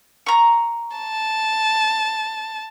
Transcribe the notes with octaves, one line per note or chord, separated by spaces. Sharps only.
A#5 C#6
A5